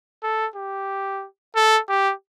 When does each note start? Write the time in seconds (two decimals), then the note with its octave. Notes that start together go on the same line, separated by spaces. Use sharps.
0.23 A4
0.56 G4
1.56 A4
1.89 G4